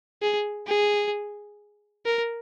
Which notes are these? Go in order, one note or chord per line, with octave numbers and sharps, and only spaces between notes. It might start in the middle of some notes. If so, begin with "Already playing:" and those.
G#4
G#4
A#4